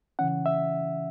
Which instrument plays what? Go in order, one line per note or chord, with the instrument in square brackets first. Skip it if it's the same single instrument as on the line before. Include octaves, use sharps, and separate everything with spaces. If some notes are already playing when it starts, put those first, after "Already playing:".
[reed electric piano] C#3 E3 C#4 F#5
E5